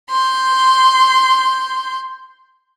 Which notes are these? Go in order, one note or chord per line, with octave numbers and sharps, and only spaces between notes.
C6 G6